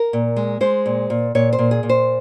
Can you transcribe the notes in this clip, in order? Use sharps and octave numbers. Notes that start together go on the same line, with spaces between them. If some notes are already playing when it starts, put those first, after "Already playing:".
Already playing: A#4
A#2
G#3
G#3 C5
A#2
A#2
A#2 C#5
C5
A#2
G#4
A#2
C5